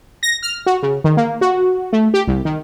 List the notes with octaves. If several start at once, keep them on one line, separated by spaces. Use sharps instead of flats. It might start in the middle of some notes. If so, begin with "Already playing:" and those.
A#6
F6
F#4
C#3
D#3
A#3
F#4
A3
G4
C2
D#3